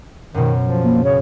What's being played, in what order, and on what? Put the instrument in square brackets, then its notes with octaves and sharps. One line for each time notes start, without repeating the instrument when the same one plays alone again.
[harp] F#2 B2 [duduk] D#3
[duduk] F3
[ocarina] A#3
[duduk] C#3 [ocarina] C#5